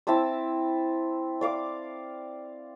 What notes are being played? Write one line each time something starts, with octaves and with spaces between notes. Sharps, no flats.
C4 E4 A5 E6
D5 F5 D6